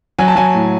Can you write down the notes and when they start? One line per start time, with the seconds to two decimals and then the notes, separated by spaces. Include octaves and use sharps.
0.19 F#3 G#5
0.28 A5
0.36 F#3 G#5
0.54 A2